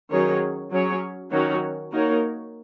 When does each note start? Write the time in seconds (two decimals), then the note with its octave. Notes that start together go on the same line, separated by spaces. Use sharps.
0.12 D#3 F#3 C#4 G#4 C#5
0.72 F#3 C#4 G#4 C#5
1.32 D#3 F#3 C#4 F#4 C#5
1.92 A#3 D#4 F#4 A#4 C#5